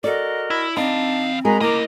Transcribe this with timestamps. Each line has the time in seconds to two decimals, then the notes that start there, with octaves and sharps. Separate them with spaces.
0.04 F#4 A4 A#4 D5 D#5
0.50 E4
0.77 E3 C4 D4 D#4 F5 A5
1.45 G#3 F#4 G#4 A#4 A#5 B5
1.61 A#3 C#4 E4 D#5 A#5 D6